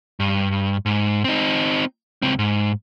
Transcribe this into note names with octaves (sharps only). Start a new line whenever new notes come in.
G2
G#2
C4 D#4
C#2 C4
G#2